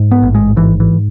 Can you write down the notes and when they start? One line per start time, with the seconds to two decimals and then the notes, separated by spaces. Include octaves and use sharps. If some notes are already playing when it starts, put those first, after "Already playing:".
Already playing: G#2
0.11 B3
0.23 A1
0.35 G#3
0.56 G#2 E3
0.80 E3